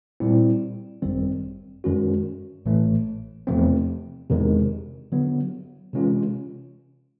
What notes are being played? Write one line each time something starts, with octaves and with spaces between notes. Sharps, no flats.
A#2 G3 C4 E4
G#1 F#2 D#3 G3 C4
F#2 D#3 G#3 C#4 F#4
A1 A2 E3 A3
E2 C3 F3 A3 C4
E2 C3 D#3 G#3
D3 F#3 B3
C3 E3 G#3 C#4 F4